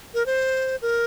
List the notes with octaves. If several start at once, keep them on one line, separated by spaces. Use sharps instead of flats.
A#4
C5
A#4